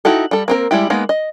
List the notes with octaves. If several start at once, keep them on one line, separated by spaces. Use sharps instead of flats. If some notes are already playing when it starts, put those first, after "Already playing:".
D#4 E4 F#4 G4 A4
G3 A4
A#3 C4 A#4
G3 G#3 E4 G4
G#3 A#3 B3 D#4
D#5